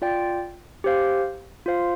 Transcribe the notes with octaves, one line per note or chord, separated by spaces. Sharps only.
F4 D5 G5
G4 C5 F5
F4 C5 F5